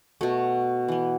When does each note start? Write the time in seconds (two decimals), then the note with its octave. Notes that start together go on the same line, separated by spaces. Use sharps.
0.21 B2 A3 F#4
0.88 E3 B3